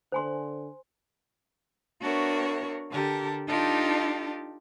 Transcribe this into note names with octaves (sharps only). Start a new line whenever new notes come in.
D3 C5 G#5 C6
B3 D4 F#4 A#4 C#5 E5
D3 G4 A4 A#4
D4 D#4 F4 G4 A4